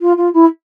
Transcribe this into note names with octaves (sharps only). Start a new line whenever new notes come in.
F4
F4
E4